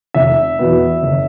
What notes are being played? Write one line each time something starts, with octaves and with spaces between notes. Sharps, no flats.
F1 E5
E2 B2 F#3 B3
F#1